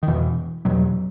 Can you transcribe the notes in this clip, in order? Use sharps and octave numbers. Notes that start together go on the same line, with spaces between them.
D#3
E2 B2 E3
E2 B2 F#3